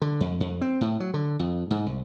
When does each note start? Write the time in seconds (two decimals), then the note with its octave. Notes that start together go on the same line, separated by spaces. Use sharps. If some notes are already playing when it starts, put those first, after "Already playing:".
0.02 D3
0.21 F2
0.40 F2
0.61 C4
0.81 A2
1.00 F#3
1.14 D3
1.39 F2
1.71 G#2
1.86 C2